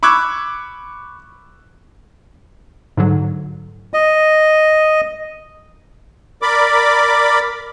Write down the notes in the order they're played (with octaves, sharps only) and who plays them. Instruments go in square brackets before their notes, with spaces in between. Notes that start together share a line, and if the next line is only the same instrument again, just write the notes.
[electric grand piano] B5 C#6 D6 E6 F#6 G#6
[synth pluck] G#2 D3 F#3
[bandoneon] D#5
[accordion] A#4 D5 B5 D6